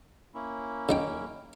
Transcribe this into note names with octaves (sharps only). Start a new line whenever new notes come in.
A#3 C#4 E4
C#3 D#4 G5